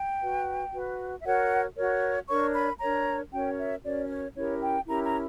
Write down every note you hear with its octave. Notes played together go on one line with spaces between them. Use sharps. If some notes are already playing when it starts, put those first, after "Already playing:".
Already playing: G5
F#4 B4
F#4 B4
E5
F#4 A#4 C#5 F#5
F#4 A#4 C#5
D4 A#4 C#5 C#6
B5
D4 A#4 C#5 A#5
C#4 F#4 A#4 C#5 G5
E5
C#4 F#4 A#4 C#5 D5
C#5
C#4 E4 G4 A#4 C#5
G5
C#4 E4 G4 A#4 A#5
A#5